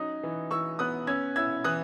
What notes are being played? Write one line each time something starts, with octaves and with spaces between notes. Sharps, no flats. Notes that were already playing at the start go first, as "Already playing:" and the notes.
Already playing: F#3 C#4 D#4 D#6
E3
E3 C#6 E6
B3 D#6 F#6
C#4 E6 G#6
E4 E6 G#6
E3 D#6 F#6